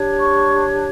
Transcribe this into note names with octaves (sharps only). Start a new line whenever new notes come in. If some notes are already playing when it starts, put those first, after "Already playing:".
Already playing: D4 G4 C#5
C#6